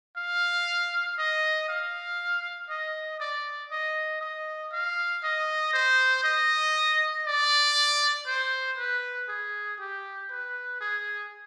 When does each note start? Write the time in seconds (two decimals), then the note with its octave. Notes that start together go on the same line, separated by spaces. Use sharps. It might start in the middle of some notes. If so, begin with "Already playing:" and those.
0.17 F5
1.18 D#5
1.69 F5
2.70 D#5
3.20 D5
3.71 D#5
4.21 D#5
4.72 F5
5.23 D#5
5.73 C5
6.24 D#5
7.26 D5
8.27 C5
8.78 B4
9.29 G#4
9.79 G4
10.30 B4
10.80 G#4